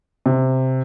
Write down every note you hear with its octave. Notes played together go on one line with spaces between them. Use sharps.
C3